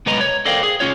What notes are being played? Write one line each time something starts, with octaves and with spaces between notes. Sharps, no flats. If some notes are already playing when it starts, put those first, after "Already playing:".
C2 G#3 B3 B4 D#5 A#5
C#5
A4 A#4 C5 D5 F5 G5
G#4
C2 C#4 F4 C#5